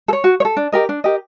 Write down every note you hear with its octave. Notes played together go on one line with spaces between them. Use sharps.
A4
C#5
F#4
C#5
A4
D4
G4 A#4 D#5
D4
G4 A#4 D#5